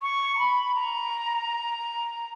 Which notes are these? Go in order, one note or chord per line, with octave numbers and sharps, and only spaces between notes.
C#6
A#5
B5
A#5